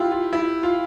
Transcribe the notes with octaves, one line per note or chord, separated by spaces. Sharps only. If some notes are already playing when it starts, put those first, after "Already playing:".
Already playing: E4 F4 G4
F4
E4
F4